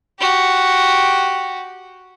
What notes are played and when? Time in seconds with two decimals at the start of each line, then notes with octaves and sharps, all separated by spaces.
0.19 F#4 G4